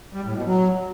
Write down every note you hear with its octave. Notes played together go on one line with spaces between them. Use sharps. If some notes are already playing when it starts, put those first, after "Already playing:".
G3
A2
B2
F#3